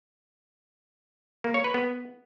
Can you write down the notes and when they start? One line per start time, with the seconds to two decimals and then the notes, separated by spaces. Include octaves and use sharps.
1.44 A#3
1.54 C#5
1.64 B4
1.74 B3